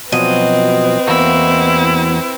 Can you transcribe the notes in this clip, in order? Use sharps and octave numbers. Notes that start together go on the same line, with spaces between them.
B2 F3 F#3 C4 B4 D#5
E2 A#3 E4 F#4